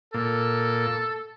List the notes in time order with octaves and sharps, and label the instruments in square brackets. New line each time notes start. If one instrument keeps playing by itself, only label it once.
[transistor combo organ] A#2 [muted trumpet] A4